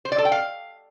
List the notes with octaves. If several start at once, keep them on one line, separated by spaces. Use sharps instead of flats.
C5
D5
A4
G5
F5